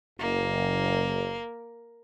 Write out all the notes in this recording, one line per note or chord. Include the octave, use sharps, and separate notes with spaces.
F#1 A#3